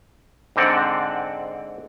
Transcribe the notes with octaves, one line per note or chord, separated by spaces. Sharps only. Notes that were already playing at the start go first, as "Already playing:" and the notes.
G#2 D3 C4 D5 F#5